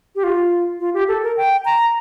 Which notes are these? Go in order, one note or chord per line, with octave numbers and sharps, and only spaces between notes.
G4
F4
F4
G4
A4
A#4
G5
A#5